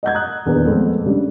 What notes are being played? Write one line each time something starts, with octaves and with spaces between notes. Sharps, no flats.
D#5 F#5 G6 G#6
A#5 D#6 F#6
D#1 E2 D#3 D4 G#4 B4
F2 G#3 A3 B3 A4
C#3 G3 D4